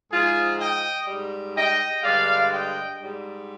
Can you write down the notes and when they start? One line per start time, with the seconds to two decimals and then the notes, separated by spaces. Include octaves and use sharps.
0.11 G#2 F3 G#3 F4 G#4
0.59 D#5 G5
1.07 G#2 G3
1.56 D#5 G5
2.03 G2 D3 G#3 D5 F5
2.52 D#5 G5
3.00 G#2 G3